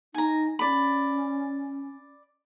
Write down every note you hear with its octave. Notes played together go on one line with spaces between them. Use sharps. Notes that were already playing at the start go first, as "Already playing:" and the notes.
D#4 G#5 A#5
C#4 D5 B5